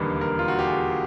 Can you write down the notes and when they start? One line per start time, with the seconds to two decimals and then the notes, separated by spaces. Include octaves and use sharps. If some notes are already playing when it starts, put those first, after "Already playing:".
Already playing: E1 D#2 D3 G3 A#3 B4
0.21 A#4
0.39 F4
0.48 F#4
0.59 G4
0.68 G#4